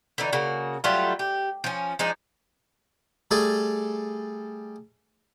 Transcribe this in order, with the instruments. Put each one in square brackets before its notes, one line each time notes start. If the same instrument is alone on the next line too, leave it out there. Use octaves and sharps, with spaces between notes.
[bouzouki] D3 E3 D#4
C#3 A#3 F#4
F#3 G3 A3 F4
G4
F3 C#4
F3 G#3 D4 D#4
[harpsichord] G3 A3 G#4 A4